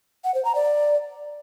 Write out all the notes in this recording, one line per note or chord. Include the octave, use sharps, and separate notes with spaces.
F#5
C5
A#5
D5